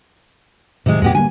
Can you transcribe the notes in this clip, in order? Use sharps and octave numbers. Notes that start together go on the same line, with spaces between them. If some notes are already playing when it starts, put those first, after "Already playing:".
A2 C3 D#3 G#3
E2 A2 G#3 B3 G4
D3 G3 A#3 G#5